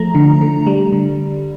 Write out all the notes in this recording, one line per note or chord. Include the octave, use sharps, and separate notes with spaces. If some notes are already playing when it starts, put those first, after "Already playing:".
Already playing: F3 A3 A#5
D3
D3
G3
D3